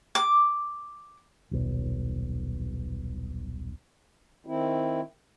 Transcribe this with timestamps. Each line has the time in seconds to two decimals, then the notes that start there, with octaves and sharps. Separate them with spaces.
0.15 D6
1.51 D#1 B1
4.46 D#3 C4 E4